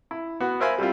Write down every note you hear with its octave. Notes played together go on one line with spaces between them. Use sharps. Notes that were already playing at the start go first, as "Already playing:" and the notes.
E4
B3 F#4
A#4 C5 E5 F5 G#5 B5
G3 C4 E4 F4